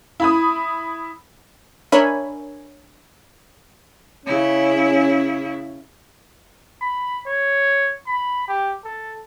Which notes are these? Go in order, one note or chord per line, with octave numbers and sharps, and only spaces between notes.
E4 B5 D#6
D4 A#4 C#5 E5 G#5 B5
C#3 C#4 E4
B5
C#5
B5
G4
A4